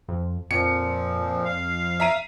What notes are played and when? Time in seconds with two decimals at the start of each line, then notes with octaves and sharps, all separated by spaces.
0.09 F2
0.51 F2 A#2 F3 C#7
1.45 F5
2.00 E5 A#5 D#7